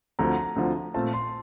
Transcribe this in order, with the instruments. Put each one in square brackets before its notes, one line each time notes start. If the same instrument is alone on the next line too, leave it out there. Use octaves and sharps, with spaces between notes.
[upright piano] D2 D3 F3 C4 [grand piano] A#5
[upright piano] D2 D3 F3 C4
[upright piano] A#2 A3 C4 F4 [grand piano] A5
[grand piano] C6